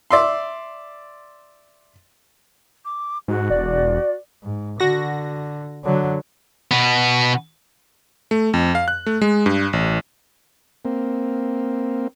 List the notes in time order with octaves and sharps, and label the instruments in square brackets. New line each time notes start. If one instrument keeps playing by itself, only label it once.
[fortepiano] D5 E5 C6
[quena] D6
[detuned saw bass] G#2 [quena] F#4
[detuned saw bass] E1 [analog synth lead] D5
[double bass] G#2
[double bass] D3 [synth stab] F#4 A#6
[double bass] D3 F#3
[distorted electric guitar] B2 B3
[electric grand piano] A3
F2
F5
F#6
A3
G#3
G2
A1
[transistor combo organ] A#3 C4